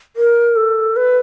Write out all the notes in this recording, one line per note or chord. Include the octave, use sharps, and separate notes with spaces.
A#4
A4
B4